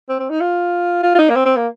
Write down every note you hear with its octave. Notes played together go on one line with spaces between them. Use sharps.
C4
C4
D#4
F4
F4
F4
D#4
A#3
C4
C4
A#3